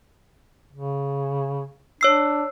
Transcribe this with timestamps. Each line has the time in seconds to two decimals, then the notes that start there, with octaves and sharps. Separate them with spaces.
0.73 C#3
2.01 D4 C#5 E6 C7